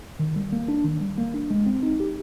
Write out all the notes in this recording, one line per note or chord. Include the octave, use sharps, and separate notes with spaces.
D#3
G3
A#3
D4
D#3
G3
A#3
D4
G#3
C4
D#4
G4